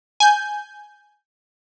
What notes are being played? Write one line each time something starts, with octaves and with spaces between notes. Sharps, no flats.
G#5 G6